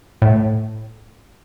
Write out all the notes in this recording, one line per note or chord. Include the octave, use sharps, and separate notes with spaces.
A2